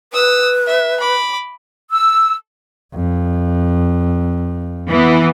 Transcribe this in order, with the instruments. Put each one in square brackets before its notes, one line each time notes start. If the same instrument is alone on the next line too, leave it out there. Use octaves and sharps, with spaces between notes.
[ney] B4 [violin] D#6 E6
[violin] E5
B5 D6
[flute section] E6
[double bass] F2
[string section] E3 B3